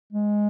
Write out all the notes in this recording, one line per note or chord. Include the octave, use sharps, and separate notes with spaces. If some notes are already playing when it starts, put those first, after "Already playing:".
G#3